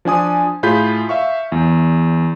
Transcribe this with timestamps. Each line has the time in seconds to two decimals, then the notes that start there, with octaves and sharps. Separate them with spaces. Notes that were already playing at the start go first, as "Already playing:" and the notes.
0.05 F3 D4 G#5 D#6
0.63 A2 F4 G#4 B5 G6 B6
1.09 E5 F5 C#6
1.52 E2